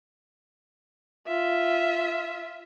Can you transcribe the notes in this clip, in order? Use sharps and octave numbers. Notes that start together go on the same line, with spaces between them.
F4 E5